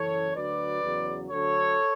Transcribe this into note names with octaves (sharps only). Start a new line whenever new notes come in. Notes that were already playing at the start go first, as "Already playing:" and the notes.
Already playing: F#1 F#2 E3 A4 C#5
D2 D3 F#3 B4 D5
E2 C#3 F#3
D2 D3 F#3 A4 C#5